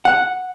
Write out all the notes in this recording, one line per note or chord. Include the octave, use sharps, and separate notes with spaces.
F#5